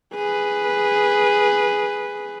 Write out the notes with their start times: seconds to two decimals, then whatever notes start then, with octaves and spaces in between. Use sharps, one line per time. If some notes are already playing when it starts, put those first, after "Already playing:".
0.15 G#4 B4